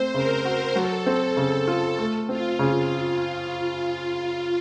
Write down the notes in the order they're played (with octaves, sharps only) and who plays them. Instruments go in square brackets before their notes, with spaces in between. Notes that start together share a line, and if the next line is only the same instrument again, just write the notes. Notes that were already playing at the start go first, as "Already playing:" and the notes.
Already playing: [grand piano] A3 C4 [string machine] C5
[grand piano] C#3 [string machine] A#4
[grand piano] F#4
[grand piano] F#3 [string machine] A4
[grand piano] C4
C#3
F4
[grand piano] A3 [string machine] A4
[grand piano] C4 [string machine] F4
[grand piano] C#3